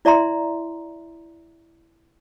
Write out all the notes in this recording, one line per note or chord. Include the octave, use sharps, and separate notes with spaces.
E4 D5 E5 A#5 C6